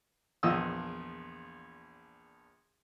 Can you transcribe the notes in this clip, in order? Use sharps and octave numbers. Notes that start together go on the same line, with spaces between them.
A#1 E2 F3 D#5 D#6 E6